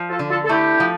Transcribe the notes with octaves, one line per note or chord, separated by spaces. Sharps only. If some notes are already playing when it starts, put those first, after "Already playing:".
Already playing: F3
F4 A4
D3
F4 A4
A4
A3 E4 G4
F3